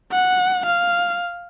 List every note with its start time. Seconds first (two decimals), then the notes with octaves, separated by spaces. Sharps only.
0.12 F#5
0.67 F5